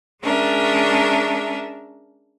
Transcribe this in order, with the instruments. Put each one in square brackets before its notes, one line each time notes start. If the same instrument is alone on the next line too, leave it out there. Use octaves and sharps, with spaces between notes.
[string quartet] G#3 C#4 D4 A#4 E5